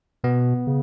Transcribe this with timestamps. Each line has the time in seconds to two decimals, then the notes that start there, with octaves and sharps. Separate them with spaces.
0.24 B2 B3
0.67 C#3